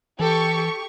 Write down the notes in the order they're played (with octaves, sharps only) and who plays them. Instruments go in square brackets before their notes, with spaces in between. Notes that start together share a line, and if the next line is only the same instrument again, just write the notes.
[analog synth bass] E3 [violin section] G4 C#6 [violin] A4